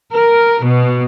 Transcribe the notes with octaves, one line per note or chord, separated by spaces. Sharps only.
A#4
B2